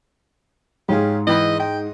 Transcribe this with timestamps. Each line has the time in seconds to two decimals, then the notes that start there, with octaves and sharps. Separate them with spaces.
0.89 G#2 C#4 F4 G4 G#4
1.27 E3 D#5 G5 B5
1.60 D#5 G5